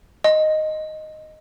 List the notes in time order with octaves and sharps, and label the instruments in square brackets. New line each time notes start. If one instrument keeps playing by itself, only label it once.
[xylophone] D#5